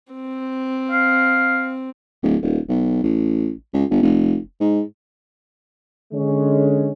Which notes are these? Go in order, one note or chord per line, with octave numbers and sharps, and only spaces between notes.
C4
F5
D1
D#1
B1
A1
C#2
G1
F1
G#2
D3 G#3 C#4